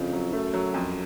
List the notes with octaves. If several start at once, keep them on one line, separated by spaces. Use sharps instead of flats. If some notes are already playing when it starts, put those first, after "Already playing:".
Already playing: F2 C#3 E4
F#3
F#2 A3
F#3
F2